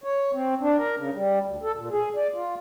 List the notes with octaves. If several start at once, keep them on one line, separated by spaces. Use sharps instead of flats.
C#5
C4
D4
A#4
C#3
G3
D2
A4
A#2
G#4
D5
F4